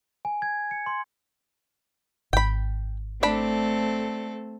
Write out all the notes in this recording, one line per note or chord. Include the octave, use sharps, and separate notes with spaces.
G#5
G#6
C#7
C6
G#1 G5 B5
A3 C4 D4 A4 B5